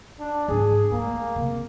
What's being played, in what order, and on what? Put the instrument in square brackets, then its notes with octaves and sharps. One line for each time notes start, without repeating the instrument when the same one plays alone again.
[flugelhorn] D4
[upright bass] G#2 [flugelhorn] G#4
[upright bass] A3 [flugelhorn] A#3
[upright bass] C3